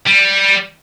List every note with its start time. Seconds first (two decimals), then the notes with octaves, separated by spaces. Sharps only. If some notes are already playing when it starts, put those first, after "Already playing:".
0.07 G3